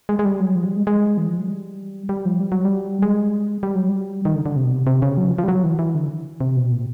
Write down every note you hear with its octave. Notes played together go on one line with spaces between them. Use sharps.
G#3
G#3
G3
F#3
F3
G3
G#3
G#3
E3
F3
F#3
G3
G3
F3
G3
F#3
G3
G#3
G3
F#3
G3
D#3
D3
D3
C3
B2
C3
C3
C#3
F#3
F3
F3
G3
F#3
E3
E3
D3
C3
B2
A#2